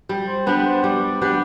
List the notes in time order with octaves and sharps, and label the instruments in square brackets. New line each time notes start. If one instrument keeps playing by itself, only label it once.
[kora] G3
[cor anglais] C5
[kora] B3 D4 G4 [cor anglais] B4
[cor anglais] B4
C5
[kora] G3 [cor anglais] D5
[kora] B3 D4 G4